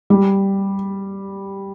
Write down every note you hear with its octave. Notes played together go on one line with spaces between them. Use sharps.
G3